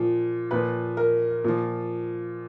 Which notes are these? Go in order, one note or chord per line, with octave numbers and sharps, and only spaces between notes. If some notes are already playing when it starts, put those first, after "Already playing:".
Already playing: A#2 F3
A#2 F3 B4
A#4
A#2 F3